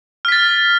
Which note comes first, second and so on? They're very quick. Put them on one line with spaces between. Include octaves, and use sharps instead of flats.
F6 B6 A6